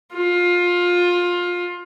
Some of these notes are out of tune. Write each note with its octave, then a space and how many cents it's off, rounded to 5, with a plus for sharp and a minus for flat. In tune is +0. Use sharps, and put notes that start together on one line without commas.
F4 +20